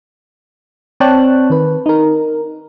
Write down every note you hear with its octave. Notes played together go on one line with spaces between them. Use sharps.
C4 C#5 D5 G5 A5 F#6
D#3 B4
D#4 A#4